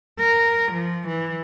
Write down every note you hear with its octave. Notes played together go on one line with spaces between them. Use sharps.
A#4
F3
E3